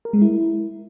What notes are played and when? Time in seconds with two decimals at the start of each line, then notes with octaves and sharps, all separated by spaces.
0.05 A#4
0.13 G#3
0.22 E4